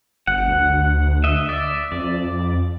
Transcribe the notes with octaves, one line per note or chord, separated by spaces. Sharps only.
G1 F#5
D2
D#5 E5
D5 E5
F2 D5